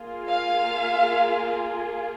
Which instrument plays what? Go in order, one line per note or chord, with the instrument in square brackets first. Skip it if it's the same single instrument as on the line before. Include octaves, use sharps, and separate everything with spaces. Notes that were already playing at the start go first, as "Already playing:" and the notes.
Already playing: [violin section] A#3 F4 G#4
F5